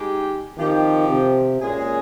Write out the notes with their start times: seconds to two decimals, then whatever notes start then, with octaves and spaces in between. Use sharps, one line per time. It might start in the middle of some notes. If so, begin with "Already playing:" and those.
Already playing: G#3 D#4 G4
0.58 D#3 F3 C4 G4
1.09 C3
1.61 A#2 G#3 C#4 G#4